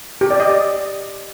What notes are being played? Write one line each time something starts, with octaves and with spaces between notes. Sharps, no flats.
G4
D5
D#5
D5